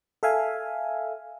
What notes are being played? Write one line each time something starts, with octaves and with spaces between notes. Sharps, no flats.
A4 E5 F5 G#5